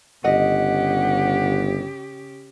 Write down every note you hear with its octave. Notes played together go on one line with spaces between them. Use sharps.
G1 C#3 G4 D#5 F#5